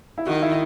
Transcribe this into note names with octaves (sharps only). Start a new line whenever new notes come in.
E4
D#3 F#4
E4